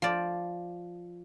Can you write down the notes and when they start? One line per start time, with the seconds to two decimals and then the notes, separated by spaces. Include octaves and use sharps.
0.02 F3 D5